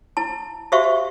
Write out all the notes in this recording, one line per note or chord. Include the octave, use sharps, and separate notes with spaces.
E4 A5
F#4 G4 C5 E5 F5 C#6